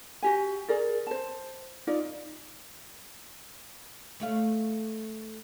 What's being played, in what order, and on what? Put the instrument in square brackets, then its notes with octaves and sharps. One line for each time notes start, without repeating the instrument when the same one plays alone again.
[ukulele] F#4 G4 G#5
G#4 A#4 D5
C5 A5
D#4 F4 D5
[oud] A3 C#5 F5